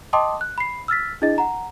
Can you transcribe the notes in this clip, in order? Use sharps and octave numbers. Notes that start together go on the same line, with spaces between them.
D#5 G5 A5 C6 D6 D#6
F#6
B5 C7
E6 F6 A6 B6
D4 E4 G#4 D#5 A6
F#5 A#5